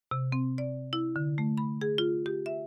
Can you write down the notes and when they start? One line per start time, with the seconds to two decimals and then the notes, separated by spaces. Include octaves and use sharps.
0.11 C3
0.32 C4
0.58 D5
0.93 E4
1.16 D3
1.38 A3
1.58 B5
1.81 G#4
1.98 F4
2.26 G4
2.46 E5